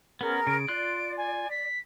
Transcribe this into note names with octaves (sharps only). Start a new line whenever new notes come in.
B3 C#4 G#4 A#4
C#3 D7
F4 D5 C6 F#6
G#5
B6